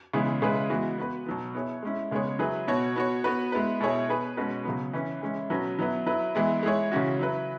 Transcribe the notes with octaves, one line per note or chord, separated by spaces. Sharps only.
C#3 E3 G#3 B3 G#4
C#3 G#3 E4 G#4 B4
E3 G#3 B3 F#4
B3 F#4 B4
B2 F#3 B3
B3 E4 G#4 C#5
G#3 C#4 E4
C#3 G#3 B3 G#4 C#5
F#3 E4 G#4 B4
B2 B3 F#4 C#5
B3 F#4 C#5
B3 F#4 B4
G#3 B3 E4 B4
B2 B3 E4 G#4 C#5
B3 G#4 B4
B2 G#3 C#4 F#4 B4
C#3 F#3 B3
E3 C#4 E4 B4
E3 G#3 C#4 E4
B2 F#3 C#4 F#4 B4
F#3 B3 E4 B4
F#3 E4 B4
E3 G#3 B3 E4
G#3 E4 G#4 C#5
C#3 E3 C#4 F#4
F#3 E4 B4